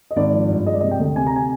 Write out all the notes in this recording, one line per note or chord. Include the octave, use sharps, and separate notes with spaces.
D#5
G#1 D5
F3
G2
G#3 D#5
D5
D#5
C3
G5
D2
C3 G#5
A#5
G#5